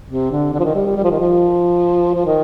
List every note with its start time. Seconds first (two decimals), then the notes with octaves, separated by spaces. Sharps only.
0.10 C3
0.31 D3
0.54 D3
0.59 F3
0.65 D#3
0.75 G3
0.86 G3
0.96 G3
1.04 F3
1.11 D#3
1.19 F3
2.15 F3
2.26 D#3